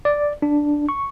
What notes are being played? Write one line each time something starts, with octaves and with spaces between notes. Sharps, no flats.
D5
D4
C#6